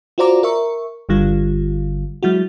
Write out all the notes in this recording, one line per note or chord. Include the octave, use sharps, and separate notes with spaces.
F4 F#4 C5 D5 A#5 D6
A#4 E5 C#6
G1 D3 G3 F4
F#3 G#3 E4 F#4